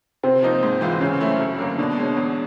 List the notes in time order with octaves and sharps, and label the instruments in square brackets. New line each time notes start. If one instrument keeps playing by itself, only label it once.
[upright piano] C3 [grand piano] C4
[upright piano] F3 A#3 D#4
G#2
E3 G#3 C4 F4
[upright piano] C#3 [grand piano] C#4
[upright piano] F#3 A3 C4 E4
F#2
D3 F#3 A#3
[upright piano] B2 [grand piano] D4
[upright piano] G#3 C#4
E2